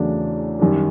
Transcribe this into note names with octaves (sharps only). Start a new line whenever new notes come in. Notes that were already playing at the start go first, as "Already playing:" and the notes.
Already playing: E2 C#3 F#3 A3 D4
F#2 D#3 G3